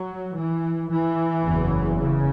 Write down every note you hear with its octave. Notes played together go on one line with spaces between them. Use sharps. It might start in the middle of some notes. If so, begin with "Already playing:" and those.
Already playing: F#3
E3
E3
F#1 E2 C#3
C#3